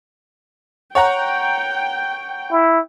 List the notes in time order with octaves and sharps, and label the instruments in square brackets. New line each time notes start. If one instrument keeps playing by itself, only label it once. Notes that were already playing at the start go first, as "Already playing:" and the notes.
[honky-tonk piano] C#5 F#5 A#5 [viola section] G5
[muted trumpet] E4